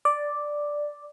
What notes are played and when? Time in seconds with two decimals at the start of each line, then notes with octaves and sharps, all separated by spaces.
0.05 D5